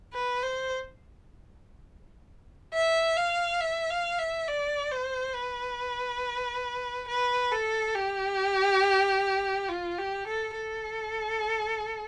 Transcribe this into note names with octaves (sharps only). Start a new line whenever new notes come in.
B4
C5
E5
F5
E5
F5
E5
D5
C5
B4
B4
A4
G4
F4
G4
A4
A4